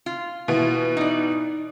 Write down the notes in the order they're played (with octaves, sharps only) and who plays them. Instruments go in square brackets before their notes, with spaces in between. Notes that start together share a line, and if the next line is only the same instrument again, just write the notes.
[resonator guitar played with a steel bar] F4
[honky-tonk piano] B2 E3 B3
[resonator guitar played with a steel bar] D#4 D5